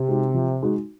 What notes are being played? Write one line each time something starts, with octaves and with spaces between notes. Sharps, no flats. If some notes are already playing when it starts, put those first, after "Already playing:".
Already playing: C3
G#3 D#4 F#4
F3
G#3 D#4 F#4